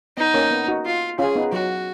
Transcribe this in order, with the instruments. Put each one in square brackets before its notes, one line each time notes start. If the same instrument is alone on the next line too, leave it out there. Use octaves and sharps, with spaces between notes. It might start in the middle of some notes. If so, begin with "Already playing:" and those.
[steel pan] B3 [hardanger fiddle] D#4
[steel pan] A#3 C#4
B3
D#4 F#4
[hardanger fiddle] F4
[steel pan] C#4 F4 [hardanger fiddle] G#4
[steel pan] B3 D#4
[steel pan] F#3 [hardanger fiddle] F#4